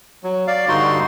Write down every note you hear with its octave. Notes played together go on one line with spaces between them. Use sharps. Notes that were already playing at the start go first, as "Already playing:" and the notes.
F#3
D5 F5
G2 D3 D#4 F#4 C6